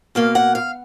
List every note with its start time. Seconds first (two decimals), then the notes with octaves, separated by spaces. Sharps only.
0.15 B2 A#3 F5
0.35 F#5
0.55 F5